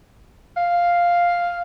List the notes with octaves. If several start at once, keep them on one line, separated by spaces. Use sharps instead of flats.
F5